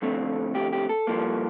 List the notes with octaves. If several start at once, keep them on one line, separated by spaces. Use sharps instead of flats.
F2 D3 A3 C4
G4
G4
A4
G2 F3 A#3